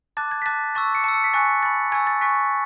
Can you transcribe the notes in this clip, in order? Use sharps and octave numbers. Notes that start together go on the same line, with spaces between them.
A5 D6 F#6 A6
G#6
B6
A5 D6 F#6 A6
A5 C#6 E6 A6
C#7
A5 E6
C#7
B6
G#5 C#6 F#6 A6
B5 F#6 A6
G#5 C#6 E6 G#6
A6
G#5 C#6 F#6 B6